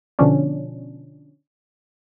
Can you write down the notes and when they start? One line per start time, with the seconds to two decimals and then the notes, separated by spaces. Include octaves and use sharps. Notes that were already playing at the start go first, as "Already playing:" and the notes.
0.19 B2 D3 F3 C#4 D4